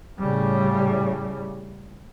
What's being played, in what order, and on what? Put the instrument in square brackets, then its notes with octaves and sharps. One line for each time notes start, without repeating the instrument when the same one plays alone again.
[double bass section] A2 C#3 G3